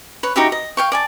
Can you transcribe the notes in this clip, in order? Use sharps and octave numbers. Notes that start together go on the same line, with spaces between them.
B4 C#5
D#4 F#4 G4 E5
D#5
F5 G5 C#6
D5 G#5 A5